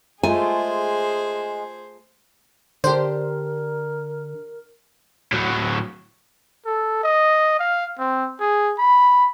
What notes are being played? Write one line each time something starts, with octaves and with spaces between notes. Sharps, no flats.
G#3 A3 F4 G#4 C5 G#5
D3 D4 G4 A#4 C5
A2 F#3
A4
D#5
F5
C4
G#4
B5